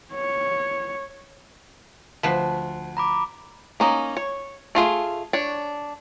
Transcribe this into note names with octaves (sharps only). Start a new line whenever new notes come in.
C#5
D2 F3 B4 F#5 A5 C6
A#5 B5 D6
A#3 C#4 D#4
C#5
A3 F4 G#4
D4 C#5